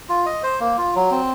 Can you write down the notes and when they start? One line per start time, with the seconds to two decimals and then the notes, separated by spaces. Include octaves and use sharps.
0.09 F4
0.26 D#5
0.43 C5
0.60 A#3
0.78 F4
0.95 F#3
1.11 C4